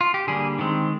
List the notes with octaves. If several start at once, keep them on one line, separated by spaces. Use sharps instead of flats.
F4
G4
D3 G3 A#3 G#4
D#3 G#3 C4